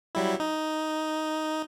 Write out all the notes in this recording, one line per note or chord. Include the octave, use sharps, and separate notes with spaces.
F#3 G3 E4
D#4